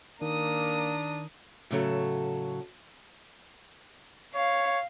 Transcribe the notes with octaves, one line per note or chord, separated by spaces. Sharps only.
D#3 A#3 D4 A#5 D#6
A2 C#3 F#3 A4
C#5 F5